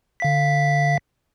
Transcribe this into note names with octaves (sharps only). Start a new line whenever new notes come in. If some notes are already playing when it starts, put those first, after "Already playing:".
D3 F5 B6